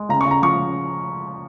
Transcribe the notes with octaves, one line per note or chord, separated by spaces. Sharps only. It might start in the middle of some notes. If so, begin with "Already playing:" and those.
Already playing: G#3
C#3 A#5
C#6
C#3
A#5
F3 C#6
C#3